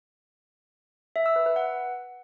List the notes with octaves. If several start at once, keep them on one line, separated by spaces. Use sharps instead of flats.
E5
E6
B4
B4
F#5